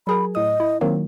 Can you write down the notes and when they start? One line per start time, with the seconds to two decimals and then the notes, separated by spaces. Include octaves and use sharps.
0.07 F#3 G#4 A#4 B5
0.35 A2 D#5 D#6
0.60 E4
0.81 D#3 F#3 A#3 C4